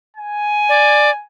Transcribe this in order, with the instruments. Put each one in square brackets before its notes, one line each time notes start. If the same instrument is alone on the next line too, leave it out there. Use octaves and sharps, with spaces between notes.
[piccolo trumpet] G#5
[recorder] D5